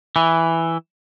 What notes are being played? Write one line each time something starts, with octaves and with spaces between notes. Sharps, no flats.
E3